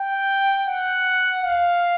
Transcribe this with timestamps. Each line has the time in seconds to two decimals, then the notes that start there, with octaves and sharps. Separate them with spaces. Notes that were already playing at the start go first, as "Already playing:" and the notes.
Already playing: G5
0.68 F#5
1.43 F5